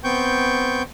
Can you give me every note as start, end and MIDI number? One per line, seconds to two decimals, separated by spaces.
0.04 0.83 59
0.04 0.83 60
0.04 0.83 79
0.04 0.83 85
0.04 0.83 91